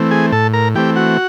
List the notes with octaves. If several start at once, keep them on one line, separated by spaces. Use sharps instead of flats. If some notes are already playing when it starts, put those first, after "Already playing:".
Already playing: E3 A3 C4
G#4 G#5
A2 A4 A5
A#4 A#5
E3 A3 C4 G4 G5
F#4 F#5